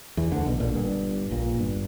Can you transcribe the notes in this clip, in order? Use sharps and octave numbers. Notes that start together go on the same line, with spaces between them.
E2 E3
D2 D3
B1 B2
A#1 A#2
G1 G2
A#1 A#2
G1 G2